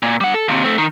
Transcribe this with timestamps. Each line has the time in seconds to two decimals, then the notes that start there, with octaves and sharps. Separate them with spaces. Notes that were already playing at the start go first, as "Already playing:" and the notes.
0.03 A#2
0.21 G3 F#5
0.34 A4
0.48 D#2 C3
0.63 A3 C4
0.78 D#3